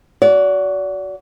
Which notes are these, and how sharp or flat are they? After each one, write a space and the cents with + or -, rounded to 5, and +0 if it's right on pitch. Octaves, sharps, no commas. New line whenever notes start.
F#4 +0 D5 -35